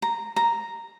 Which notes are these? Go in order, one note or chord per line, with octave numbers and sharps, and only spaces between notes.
A#5
A#5